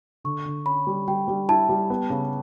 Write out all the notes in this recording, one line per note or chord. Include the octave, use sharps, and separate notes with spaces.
D3 C#6
D3
C#4 B5
G3
G3 G5
G3
E4 A5
G3
B3
C#3